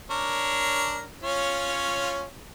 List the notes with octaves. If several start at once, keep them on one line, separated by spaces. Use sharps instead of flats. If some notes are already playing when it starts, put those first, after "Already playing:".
D4 A#4 C#5
C#4 F4 C#5